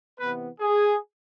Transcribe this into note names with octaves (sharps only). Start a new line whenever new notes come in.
C3 E3 B3 B4
G#4